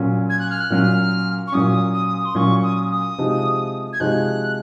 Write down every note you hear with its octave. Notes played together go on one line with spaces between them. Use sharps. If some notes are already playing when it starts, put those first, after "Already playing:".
Already playing: A#2 F#3 C#4
G#6
F#6
F6
F#6
A#2 F#3 C#4 F6
C#6
A#2 F#3 C#4 D#6
D#6
C6
A#2 F#3 C#4 C#6
D#6
D#6
C3 F3 G#3 D#4 F#4
G#6
C3 F3 G#3 D#4 F#4 F#6